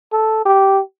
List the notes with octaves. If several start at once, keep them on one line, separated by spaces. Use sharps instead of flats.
A4
G4